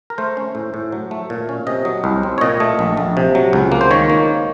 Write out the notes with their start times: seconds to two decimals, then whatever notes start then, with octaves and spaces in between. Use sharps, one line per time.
0.10 A#4
0.18 A3 C5
0.37 C#4
0.55 A2
0.74 A2
0.92 F#3
1.11 A3
1.30 A#2
1.49 C#4
1.67 C3 D#5
1.85 F#3
2.04 C2
2.23 C4
2.38 C#5
2.41 A#2 D#5
2.60 A3
2.79 A#1
2.97 A#1
3.17 C3
3.35 F#3
3.53 C#2
3.72 A#3
3.81 C5
3.91 D#3 C#5
4.10 A#3